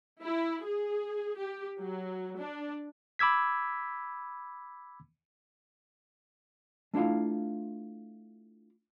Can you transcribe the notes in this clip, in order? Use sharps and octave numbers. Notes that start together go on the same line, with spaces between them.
E4
G#4
G4
F#3
D4
B5 D6 E6 G#6 B6
A3 D4 E4 F4 F5